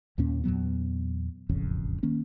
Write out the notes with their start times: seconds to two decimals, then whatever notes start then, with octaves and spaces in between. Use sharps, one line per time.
0.18 D#2 A#2 A#3 C#4
0.44 E2 A#2 F#3 B3
1.49 E1 A1 F2 C#3
2.03 D#3 A#3 C#4